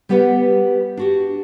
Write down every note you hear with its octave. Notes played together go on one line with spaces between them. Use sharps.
G3 B3 G4 B4 E5 F#5
D4 F#4 G4